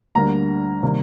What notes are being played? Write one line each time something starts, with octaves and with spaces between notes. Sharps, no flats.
D2 D3 G3 A#3 A#5
C3 D#3 G3 A#3